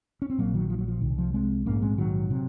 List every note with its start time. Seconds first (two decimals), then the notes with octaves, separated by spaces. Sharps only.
0.22 C#4
0.30 C4
0.38 A#1 A#2 F#3 A#3
0.54 D#3 F#3
0.70 F3
0.79 F#3
0.88 F3
1.01 C2 C3 D#3
1.18 F3
1.34 G#3 C4
1.66 A#1 G#2 A#3 C#4
1.82 G#3 C4
1.98 D#3 F#3
2.30 C3